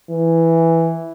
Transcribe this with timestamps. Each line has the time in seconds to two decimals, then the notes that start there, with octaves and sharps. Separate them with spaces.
0.10 E3